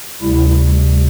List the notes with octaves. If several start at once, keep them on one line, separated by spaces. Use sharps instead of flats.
D2 C3 G3 E4